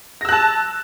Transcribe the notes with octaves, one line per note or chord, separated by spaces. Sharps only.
A5 E6 F#6 A#6